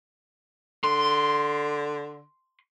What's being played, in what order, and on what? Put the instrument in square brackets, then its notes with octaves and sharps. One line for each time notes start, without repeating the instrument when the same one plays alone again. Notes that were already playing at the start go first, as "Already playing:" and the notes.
[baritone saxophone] D3 [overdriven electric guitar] C6